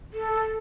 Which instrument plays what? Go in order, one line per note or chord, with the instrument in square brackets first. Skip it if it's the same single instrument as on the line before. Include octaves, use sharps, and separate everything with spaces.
[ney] A4